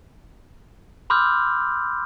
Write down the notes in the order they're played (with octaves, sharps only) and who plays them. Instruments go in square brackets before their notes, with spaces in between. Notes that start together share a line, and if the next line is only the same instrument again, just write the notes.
[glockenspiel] B5 C6 D6 E6 F6 G6